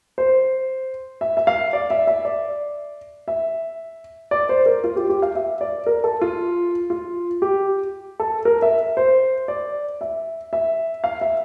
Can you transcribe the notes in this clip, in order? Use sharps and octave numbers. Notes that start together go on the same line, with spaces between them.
C5
E5
E5
F5
D5
E5
E5
D5
E5
D5
C5
A#4
F4
G4
G4
F5
E5
D5
A#4
A4
F4
F4
G4
A4
A#4
E5
C5
D5
E5
E5
F5
E5